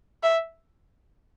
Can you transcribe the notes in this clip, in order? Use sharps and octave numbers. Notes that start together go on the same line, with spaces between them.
E5